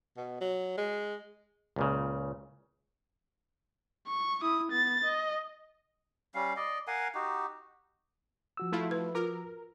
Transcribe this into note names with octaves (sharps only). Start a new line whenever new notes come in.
B2
F#3
G#3
C#2 A#2 C#3
C#6
E4 D#6
B3 A6
D#5
G3 C#4 F5
D5 D#5
A#4 F5 F#5 G#5
D#4 F#4 G4
F3 F#4 E6
A3 E4 F4
B4
F4 A#4